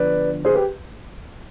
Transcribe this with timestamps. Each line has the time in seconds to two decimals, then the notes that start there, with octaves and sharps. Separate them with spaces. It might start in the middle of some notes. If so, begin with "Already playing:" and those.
Already playing: D3 F3 B3 B4 D5
0.45 G#4 C5
0.55 G4 B4